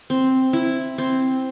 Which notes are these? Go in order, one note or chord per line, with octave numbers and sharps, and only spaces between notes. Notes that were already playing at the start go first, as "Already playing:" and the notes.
C4
E4
C4